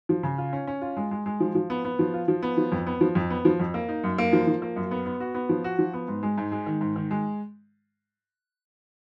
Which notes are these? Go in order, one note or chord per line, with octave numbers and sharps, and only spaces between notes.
F3
C#3
F4
C#4
C#4
F4
G#3
G#3
G#3
F3
F3
B3
B3
F3
F4
F3
B3
F3
F2
B3
F3
F2
B3
F3
F2
A#3
D#4
F#2
A#3
F3
F3
A#3
F#2
B3
B3
F#4
B3
F3
F#4
F3
B3
G#2
G#3
G#2
G#3
D#3
G#2
D#3
G#3